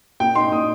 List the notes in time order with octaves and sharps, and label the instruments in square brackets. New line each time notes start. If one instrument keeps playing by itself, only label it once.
[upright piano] A#2 G5
D#4 C6
A#2 D#6